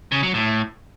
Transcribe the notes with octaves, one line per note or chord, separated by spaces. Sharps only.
C#3
F#3
A2